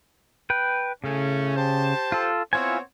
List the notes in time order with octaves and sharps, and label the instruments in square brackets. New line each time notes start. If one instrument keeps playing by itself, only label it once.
[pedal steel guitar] B4 G5
[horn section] A2 A3 C#4 [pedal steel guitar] C#3
[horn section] G4 C5 A5
[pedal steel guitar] F4 A4
[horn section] B3 C4 C#5 [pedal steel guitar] E4 F4 G#5